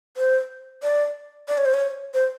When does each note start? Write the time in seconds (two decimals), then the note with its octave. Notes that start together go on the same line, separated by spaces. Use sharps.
0.17 C5
0.83 D5
1.48 D5
1.58 C#5
1.65 C5
1.74 C#5
2.14 C5